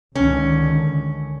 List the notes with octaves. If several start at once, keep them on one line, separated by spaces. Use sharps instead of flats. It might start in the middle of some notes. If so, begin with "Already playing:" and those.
C#2 D3 D#3 C#4